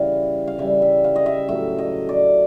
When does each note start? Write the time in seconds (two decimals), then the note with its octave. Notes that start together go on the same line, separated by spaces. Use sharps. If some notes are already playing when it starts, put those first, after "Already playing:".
Already playing: C#3 E3 G3 F5
0.47 F5
0.58 C#3 E3 G3 E5
0.82 E5
1.04 F5
1.16 D#5
1.26 E5
1.49 A2 F#3 A3 E5
1.79 D#5
2.09 D5